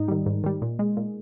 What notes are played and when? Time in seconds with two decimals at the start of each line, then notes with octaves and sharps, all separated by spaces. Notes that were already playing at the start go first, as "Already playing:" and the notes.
Already playing: G#2 D#4
0.08 D#3 G3
0.26 G#2
0.44 D#3 G3
0.62 A#2
0.79 G#3
0.97 A#2